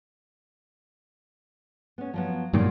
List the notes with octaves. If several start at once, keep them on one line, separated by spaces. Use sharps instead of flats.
B3 C#4
F3 F#3 B3
G2 A#2 D#3 F#3 F4 D5